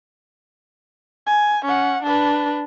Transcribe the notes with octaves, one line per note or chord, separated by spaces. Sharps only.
G#5
C#4 F#5
D4 B4